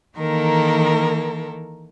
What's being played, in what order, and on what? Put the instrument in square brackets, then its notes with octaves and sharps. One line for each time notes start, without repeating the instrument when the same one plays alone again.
[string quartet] D#3 E3 A#3 A4 A#4